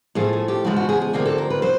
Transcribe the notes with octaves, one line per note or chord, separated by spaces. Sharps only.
A2 F3 A3 G#4
G#4
G4
E2 C#3 F3 G#3 F#4
F#4
G#4
G#4
D2 C3 F3 A#3 G#4
A4
A#4
B4
F#3 C5